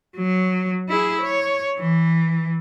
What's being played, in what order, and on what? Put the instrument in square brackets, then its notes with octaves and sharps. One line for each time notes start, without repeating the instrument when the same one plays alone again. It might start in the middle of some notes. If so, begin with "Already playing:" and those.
[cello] F#3
E4 G#4
C#5
E3